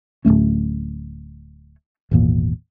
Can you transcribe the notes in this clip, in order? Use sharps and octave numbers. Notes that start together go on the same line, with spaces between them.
D1 G2 A3 C#4
G#1 E2 A#2